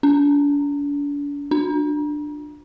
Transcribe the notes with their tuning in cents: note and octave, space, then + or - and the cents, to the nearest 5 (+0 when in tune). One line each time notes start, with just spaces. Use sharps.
D4 -40
D4 +15